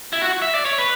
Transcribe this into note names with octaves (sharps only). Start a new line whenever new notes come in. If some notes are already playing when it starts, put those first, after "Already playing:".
E4
F#4
E5
D5
C#5
B4